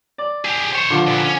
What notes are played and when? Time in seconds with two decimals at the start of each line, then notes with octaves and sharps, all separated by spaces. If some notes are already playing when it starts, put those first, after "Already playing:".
0.18 D5
0.45 G4 G#4
0.72 C5 C#5
0.90 D3 F3
1.07 A#2 B3
1.25 C#4